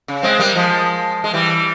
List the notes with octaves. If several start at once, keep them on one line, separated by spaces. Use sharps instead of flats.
C#3
G#3 C4
G3 A#3
F3 G#3
G#3
E3 G3